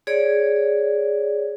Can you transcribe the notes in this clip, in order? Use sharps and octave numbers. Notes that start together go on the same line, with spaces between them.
G#4 C#5 D5